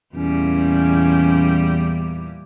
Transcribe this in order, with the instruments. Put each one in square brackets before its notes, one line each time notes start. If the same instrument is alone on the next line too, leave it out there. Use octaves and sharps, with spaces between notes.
[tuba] E2 [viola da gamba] A#2 E3 G3 [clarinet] C#4